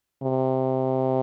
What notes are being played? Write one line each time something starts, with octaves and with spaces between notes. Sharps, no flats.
C3